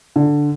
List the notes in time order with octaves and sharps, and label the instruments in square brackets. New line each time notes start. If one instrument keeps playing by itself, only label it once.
[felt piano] D3